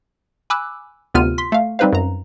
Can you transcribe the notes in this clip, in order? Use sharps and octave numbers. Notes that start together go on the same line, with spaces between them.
G#5 B5 D6 E6 F#6
D2 C3 B3 F4 F6 D#7
C6 B6
A3 F5
G3 C4 D#4 B4 C5 F5
F#2 A#5